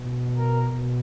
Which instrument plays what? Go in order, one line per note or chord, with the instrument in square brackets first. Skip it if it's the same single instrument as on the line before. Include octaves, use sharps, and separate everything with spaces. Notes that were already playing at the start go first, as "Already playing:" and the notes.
Already playing: [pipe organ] B2
A#4
B2